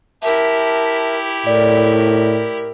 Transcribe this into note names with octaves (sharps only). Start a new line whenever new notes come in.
E4 G4 A#4 E5 A5
A2 A#4 D5